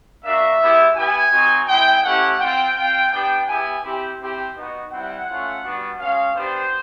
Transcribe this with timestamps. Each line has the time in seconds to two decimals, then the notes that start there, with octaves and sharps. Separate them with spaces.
0.24 A#3 D4 F#4 E5
0.60 G#3 B3 E4 G4
0.96 B3 E4 G4 G#5
1.32 C4 D#4 F#4
1.68 G#3 C4 E4 G5
2.03 A3 C#4 E4 G4 F#5
2.39 C4 F4 G5
2.76 C4 F4 G5
3.11 B3 D4 G4 G5
3.47 B3 E4 G4 G#5
3.83 C4 E4 G4
4.20 C4 E4 G4
4.55 B3 D#4 F#4
4.91 G3 C4 E4 F#5
5.28 A3 C#4 F4
5.63 G3 B3 D4 F#4
5.99 G#3 C#4 F#4 F5
6.35 B3 D4 G4 C5